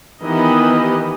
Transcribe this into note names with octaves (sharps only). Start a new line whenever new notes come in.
D#3 E3 B3 G4 D#5